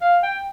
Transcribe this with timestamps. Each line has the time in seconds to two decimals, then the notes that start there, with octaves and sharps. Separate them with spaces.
0.01 F5
0.23 G5